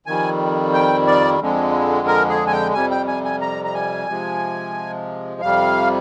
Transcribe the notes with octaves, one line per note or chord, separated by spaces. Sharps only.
F2 D#3 G3 G#5
G5
D5
F2 D3 G#3
A#4
G#4
G#5
G5
F2 C3 G3 G#5
G5
G#5
G#5
A#5
A#5
G#5
C3 F3 G#3
F2 C3 G3 F5